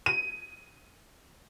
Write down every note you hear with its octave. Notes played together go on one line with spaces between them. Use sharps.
D#7